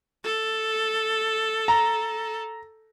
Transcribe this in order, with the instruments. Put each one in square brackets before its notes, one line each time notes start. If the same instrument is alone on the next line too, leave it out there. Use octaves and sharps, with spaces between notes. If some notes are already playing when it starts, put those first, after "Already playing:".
[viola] A4
[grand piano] A#5